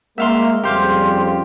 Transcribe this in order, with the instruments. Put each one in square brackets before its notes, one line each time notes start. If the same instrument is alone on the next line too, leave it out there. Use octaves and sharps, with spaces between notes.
[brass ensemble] G#3 A#3 [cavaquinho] E5 F5 C6
[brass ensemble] F2 C#3 G3 [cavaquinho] G4 C5 F5 [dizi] C6